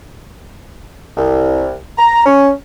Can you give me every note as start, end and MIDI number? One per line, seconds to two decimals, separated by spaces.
1.17 1.75 36
1.98 2.24 82
2.25 2.50 61